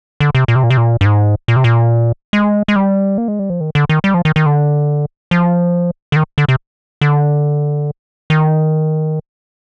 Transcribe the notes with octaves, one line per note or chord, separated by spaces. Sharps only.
D3
C3
A#2
C3
A#2
C3
A#2
G2
G#2
A#2
C3
A#2
G#3
G#3
G3
A#3
G#3
G3
F3
D#3
D3
D#3
G3
F3
D#3
D#3
D3
F3
D3
D#3
D3
C3
D3
D#3